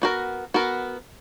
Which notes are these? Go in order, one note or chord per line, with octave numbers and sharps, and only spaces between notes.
B3 F#4 A#4
B3 F#4 A#4